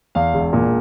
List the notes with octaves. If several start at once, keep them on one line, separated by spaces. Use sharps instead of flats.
E2 F5
E1
A#2